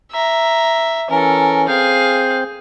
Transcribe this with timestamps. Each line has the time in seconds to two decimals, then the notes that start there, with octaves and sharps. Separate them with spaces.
0.12 E5 A#5
1.10 E3 C#4 A4 A#4
1.68 C4 G#4 F5 G6